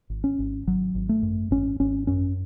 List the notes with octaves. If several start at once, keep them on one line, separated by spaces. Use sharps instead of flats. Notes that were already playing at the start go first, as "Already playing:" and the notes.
G#1
C#4
G#1
G#1 F#3
G#1
A3
F#2
G#1 C#4
G#1 C#4
F#2 C#4